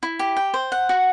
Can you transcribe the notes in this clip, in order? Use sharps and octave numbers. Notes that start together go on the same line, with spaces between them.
E4
G4
G5
C5
F#5
F#4